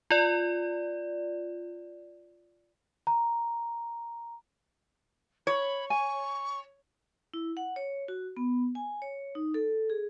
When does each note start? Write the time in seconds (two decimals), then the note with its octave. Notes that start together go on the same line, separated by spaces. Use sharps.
0.11 F4 D5
3.07 A#5
5.47 C#5 B5
5.90 G#5 C#6
7.34 E4
7.57 F#5
7.76 C#5
8.08 F#4
8.37 B3
8.75 G#5
9.02 C#5
9.35 D#4
9.54 A4
9.90 G#4